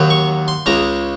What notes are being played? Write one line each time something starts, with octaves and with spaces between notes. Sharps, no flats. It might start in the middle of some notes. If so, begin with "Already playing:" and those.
Already playing: D#2 D#3 F#3
C#6
C6
C#2 C#3 G#3 A#5